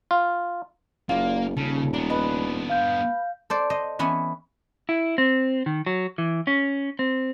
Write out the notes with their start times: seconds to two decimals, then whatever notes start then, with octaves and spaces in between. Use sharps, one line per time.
0.11 F4
1.09 F#1 A#3 F4 D5
1.57 D#1 C#3 A4
1.94 B3 D4 A#5
2.09 B4 D#5
2.70 F5 G6
3.50 A4 C5 D5
3.70 C5 D#5
3.99 E3 B3 C#4 E4
4.89 E4
5.18 C4
5.66 D#3
5.86 F#3
6.18 E3
6.47 C#4
6.99 C4